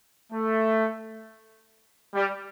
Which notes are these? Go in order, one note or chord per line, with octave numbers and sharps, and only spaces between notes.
A3
G3